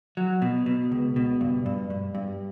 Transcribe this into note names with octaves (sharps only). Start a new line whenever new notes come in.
F#3
B2
B2
C#2
B2
G2
G2
G2
G2